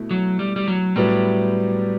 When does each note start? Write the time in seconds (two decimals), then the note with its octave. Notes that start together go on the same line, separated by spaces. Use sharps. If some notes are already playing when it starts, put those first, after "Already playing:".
Already playing: B2 A3 E4
0.11 F#3
0.39 G3
0.56 G3
0.68 F#3
0.96 A2 F#3 G3 B3